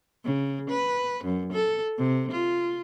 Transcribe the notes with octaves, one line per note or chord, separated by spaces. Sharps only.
C#3
B4
F#2
A4
C3
F4